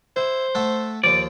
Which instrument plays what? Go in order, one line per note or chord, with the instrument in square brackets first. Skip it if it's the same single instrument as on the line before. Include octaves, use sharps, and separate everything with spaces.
[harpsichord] E4 [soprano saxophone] C5
[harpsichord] A3 A4 F#5
[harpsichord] D#2 F3 [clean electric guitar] D5